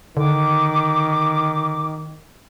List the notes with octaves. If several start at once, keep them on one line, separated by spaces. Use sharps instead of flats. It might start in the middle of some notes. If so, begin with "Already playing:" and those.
D3 D#3 D6